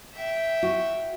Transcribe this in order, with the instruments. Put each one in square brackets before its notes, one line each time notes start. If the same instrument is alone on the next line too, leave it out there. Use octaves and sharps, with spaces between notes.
[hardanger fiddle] E5 G5
[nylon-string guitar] F#4